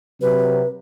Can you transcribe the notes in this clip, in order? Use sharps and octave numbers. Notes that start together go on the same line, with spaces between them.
C3 F#3 B4